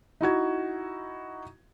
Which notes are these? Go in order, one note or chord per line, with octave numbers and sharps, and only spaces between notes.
D#4 E4 F#4 G#6